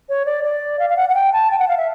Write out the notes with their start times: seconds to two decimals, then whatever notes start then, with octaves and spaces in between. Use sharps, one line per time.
0.09 C#5
0.26 D5
0.44 D5
0.79 F5
0.90 F5
0.97 F#5
1.09 F#5
1.15 G5
1.33 A5
1.51 G5
1.59 F#5
1.69 F5
1.77 E5